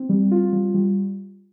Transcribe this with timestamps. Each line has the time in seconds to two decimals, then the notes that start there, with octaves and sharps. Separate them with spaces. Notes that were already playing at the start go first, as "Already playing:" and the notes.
Already playing: C4
0.09 G3
0.31 F4
0.53 G3
0.74 G3